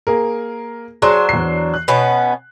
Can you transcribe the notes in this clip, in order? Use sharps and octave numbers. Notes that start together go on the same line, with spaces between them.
A#3 G#4 A#4
F#3 D4 G#4 C5 C6
E2 C7
F#6
B2 B3 C#4